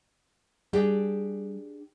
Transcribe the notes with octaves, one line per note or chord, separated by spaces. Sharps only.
G3 D4 G4 G#4